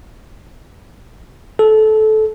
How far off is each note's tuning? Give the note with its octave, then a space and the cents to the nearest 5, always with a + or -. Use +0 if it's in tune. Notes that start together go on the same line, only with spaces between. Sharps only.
A4 -20